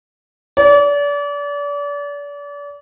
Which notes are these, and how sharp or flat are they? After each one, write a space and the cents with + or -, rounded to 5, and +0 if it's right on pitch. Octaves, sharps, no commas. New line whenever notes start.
D5 -35